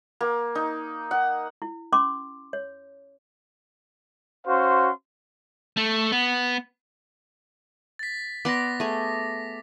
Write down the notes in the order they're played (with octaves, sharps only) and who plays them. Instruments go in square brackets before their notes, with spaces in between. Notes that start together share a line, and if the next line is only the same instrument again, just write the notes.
[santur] A#3
D#4
F#5
[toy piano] E4
C#4 C6 D6
C#5
[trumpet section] C#4 F#4 C5 F5 C6
[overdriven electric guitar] A3
B3
[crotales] A6 B6
[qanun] B3 D5 C6 [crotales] D6 A#6
[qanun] A3 G#4